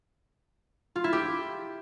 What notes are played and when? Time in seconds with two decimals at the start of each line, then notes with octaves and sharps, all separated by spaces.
0.96 F4
1.04 E4
1.13 G4